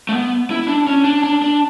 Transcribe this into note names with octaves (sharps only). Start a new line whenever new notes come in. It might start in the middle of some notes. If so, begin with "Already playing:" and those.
A3
B3
E4
D4
C#4
D4
D4
D4